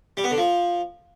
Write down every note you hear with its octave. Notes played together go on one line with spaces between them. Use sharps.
G3
B3
D3
F3